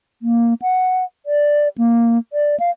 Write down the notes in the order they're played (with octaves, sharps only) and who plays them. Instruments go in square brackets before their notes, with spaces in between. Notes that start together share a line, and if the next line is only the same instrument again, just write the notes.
[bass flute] A#3
F#5
D5
A#3
D5
F5